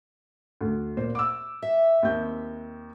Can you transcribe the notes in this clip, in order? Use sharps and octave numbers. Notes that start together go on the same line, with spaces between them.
D2
A#2 C5
D6 E6
E5
D#2 C4 G6